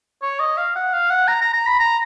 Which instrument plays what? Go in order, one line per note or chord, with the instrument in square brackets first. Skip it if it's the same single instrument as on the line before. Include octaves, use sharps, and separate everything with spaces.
[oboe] C#5
D#5
F5
F#5
F5
F#5
A#5
A#5
A#5
B5
A#5